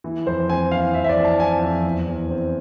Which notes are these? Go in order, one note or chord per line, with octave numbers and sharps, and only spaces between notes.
E3
F2 C5
C4 G#5
E3 F5
F2 E5
E5
D5
E3
A5
C4 G#5
F2
E2
E2
C4